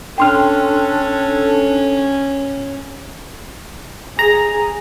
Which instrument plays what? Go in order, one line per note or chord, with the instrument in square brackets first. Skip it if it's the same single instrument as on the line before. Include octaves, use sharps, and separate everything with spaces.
[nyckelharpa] C#4 [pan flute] D4 [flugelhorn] A4 [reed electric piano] G5 C6 F6
[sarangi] G#4 [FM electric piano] A#5